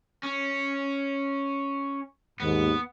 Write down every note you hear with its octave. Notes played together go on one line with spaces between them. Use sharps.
C#4
D#2 G#2 B3